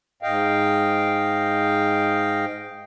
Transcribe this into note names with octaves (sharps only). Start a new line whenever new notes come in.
G#2 D#5 F5 G5